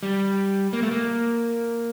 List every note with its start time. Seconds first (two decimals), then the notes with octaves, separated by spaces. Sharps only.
0.03 G3
0.73 A#3
0.82 A3
0.91 A#3